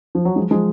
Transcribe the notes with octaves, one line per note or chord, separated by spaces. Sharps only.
F3
F#3
F3 G#3
F3 G#3